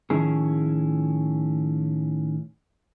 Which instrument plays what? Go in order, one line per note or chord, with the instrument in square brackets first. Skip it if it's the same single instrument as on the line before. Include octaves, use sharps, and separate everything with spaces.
[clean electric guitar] A2 D#3 F3 C#4 E4 G#4